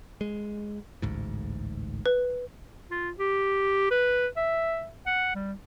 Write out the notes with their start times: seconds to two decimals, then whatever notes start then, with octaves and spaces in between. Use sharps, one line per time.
0.21 G#3
1.02 A1 D2 G#2
2.06 B4
2.91 F4
3.18 G4
3.91 B4
4.37 E5
5.06 F#5
5.35 G3